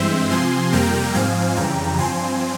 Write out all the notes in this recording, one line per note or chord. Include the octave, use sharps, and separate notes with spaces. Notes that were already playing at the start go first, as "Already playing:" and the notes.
Already playing: G2 E3 G#3 C4 C5 E5
C3 F3 C4 G#5 C6
F2 C3 G3 A#3 G5 A#5
G#2 F3 C4 F5 G#5
F2 C#3 E3 G3 G5 A#5
G2 F3 C4 G#5 C6